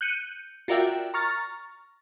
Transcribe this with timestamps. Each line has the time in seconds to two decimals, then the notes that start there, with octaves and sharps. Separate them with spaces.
0.01 F#6 G6 C#7 D#7
0.68 F4 F#4 A#4 D5 E5 G5
1.14 A#5 C#6 F6 A6